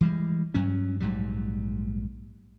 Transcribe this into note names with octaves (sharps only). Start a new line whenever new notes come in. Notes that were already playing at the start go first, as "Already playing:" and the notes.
E3 G3 G#3
G2 F#3 C#4
A#1 G#2 F#3 G3